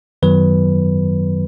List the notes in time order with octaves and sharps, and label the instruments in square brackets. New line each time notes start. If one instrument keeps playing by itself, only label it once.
[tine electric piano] F#2 D#3 F#3 B3 B4